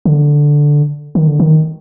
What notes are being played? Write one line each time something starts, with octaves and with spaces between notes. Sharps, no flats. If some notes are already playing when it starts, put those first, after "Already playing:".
D3
D#3
D3
D#3